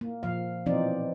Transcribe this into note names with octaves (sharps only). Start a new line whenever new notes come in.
A#3
A#2 F3 F5
B2 E3 F3 C4 D#4 D5